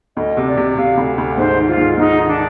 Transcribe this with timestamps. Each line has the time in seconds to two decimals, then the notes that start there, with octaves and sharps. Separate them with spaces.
0.17 D2 D#5
0.37 C3
0.47 D5
0.57 C3
0.77 C3 F5
0.97 D2
1.18 D2
1.38 G#2 C5
1.58 D#3
1.68 F4
1.78 G#2
1.98 G#2 D#4
2.18 D#3
2.28 D4